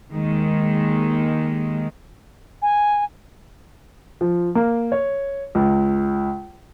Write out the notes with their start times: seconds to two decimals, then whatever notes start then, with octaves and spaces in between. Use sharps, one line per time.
0.12 D#2 D#3 G#3
2.62 G#5
4.21 F3
4.55 A#3
4.92 C#5
5.55 C#2